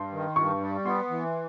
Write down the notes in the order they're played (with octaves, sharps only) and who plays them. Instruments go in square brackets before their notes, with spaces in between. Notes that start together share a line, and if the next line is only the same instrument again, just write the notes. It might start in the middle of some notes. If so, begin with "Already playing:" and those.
Already playing: [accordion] G2 [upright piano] C6
[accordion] D#3
[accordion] G2 [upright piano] C#6
[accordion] G3
[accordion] B3 [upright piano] C6
[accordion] E3